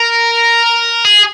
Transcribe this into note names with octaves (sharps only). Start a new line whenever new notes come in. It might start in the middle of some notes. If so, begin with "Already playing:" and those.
Already playing: A#4
G#4